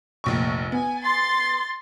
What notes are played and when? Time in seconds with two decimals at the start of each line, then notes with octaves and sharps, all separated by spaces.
0.24 F1 A#1 C#6
0.72 B3 G#5
1.03 C6 A6